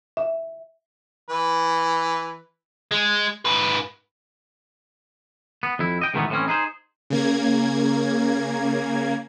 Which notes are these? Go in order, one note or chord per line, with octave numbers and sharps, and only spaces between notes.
E5
E3 B4
G#3
G#2 B4
B3
F2 E4
D#5 G5
G#2 B2 D#3 E3 A3 B3
A2 E3 C4 C#4
D#4 G#4 B4 C5
C#3 A#3 G#6